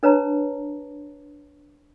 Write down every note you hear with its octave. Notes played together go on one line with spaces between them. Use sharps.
D4 B4 C#5 A5 A#5